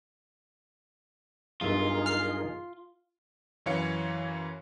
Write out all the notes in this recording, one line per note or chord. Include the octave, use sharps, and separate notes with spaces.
B1 G2 D#4 F4 G#4 A#4 E5
F6 C7
F#2 E3 C#5 F5 C#7